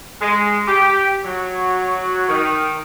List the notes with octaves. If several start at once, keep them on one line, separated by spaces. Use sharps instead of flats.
G#3
G4
F#3
D#3